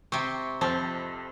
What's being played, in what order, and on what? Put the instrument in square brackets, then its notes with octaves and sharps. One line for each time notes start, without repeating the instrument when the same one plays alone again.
[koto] C3 C4 [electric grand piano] C#6
[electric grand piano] F2 [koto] C4 [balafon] C5 [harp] A5 F6